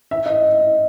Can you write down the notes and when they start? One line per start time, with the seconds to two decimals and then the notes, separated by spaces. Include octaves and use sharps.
0.11 E5
0.26 D#5